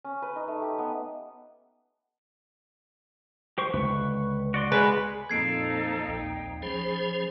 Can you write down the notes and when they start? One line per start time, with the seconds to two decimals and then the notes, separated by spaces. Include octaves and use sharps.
0.04 C#4
0.22 B4
0.36 D#4
0.48 A3
0.62 G4
0.78 B3
3.58 G4 C5 C#6
3.74 C#2 D3 B4 C#6
4.54 F#4 D5 C6
4.72 G#3 B4
5.29 F2 A#2 D#4 A4 G#6 C7 D7
6.07 A#1 D#2 G5
6.62 F3 C#4 G#4 C5 B5